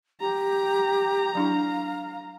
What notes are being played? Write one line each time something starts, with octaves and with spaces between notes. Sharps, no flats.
G4 A#5
F#3 D4 E4 F5